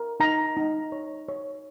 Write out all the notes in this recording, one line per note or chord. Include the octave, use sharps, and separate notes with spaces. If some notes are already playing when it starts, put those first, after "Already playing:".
Already playing: A#4
D#4 A#5
D#4
C#5
C#5